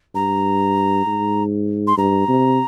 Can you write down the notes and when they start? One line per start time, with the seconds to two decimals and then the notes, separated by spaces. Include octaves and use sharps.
0.15 G2 A#5
1.06 G#2
1.87 C6
1.97 G2 A#5
2.28 C3